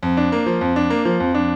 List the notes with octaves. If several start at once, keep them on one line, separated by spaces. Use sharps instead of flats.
F2
D4
A#3
F3
F2
D4
A#3
F3
F2
D4